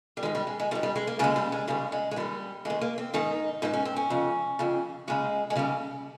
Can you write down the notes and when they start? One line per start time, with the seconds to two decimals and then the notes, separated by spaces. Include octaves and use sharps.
0.17 G3
0.23 G#2 D#3 G#3
0.35 G3
0.47 G#3
0.60 G#3
0.71 D#3 G3
0.75 G#2
0.83 G3
0.96 G#3
1.07 A#3
1.19 D#2 C#3 G#3
1.36 G3
1.52 G#3
1.68 D#2 C#3 G3
1.92 G#3
2.11 G#3
2.16 D#2 D#3 G3
2.65 D#2 D#3 G#3
2.81 A#3
2.98 C4
3.14 G#2 D#3 D#4
3.62 G#2 D#3 D#4
3.73 C#4
3.85 C4
3.96 C#4
4.10 F2 C#3
4.59 F2 C#3
5.08 D#2 C#3 G#3
5.50 G#3
5.56 D#2 C#3 G3